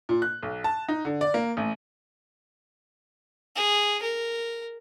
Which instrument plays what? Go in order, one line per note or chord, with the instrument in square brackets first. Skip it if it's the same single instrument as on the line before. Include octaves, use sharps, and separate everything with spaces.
[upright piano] A#2
F#6
B1
A5
D#4
D3
D5
A#3
A1
[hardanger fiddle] G#4
A#4